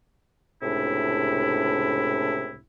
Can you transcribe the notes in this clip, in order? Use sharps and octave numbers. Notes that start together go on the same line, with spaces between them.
C#2 A2 C3 D4 E4